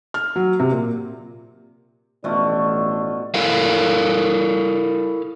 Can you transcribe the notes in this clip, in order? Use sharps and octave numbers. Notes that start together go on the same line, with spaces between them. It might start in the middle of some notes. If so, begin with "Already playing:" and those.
F6
F#3
C3
A#2
A1 B2 F3 A3 D4
E4 A4 A#4 F5